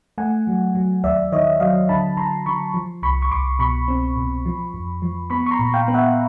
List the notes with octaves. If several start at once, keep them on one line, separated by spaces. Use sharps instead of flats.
A3 F#5 G#5
F#3
F#3
D#2 D5 E5
D#3 C#5 D#5
F#3 D#5 F5
D3 A5 B5
D3 A#5 C6
D3 B5 C#6
F3
C2 B5 C#6
C#6
C2 C6 D6
B2 B5 C#6
C4
B2
F3
F2
F3
B3 B5 C#6
C#6
A#5 C6
A#2
F5 G5
B3
E5 F#5